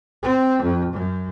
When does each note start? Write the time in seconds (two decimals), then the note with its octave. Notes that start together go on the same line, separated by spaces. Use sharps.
0.23 C4
0.62 F2
0.93 F#2